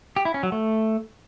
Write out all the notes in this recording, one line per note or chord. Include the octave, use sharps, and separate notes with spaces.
G4
E4
C#4
F#3
A3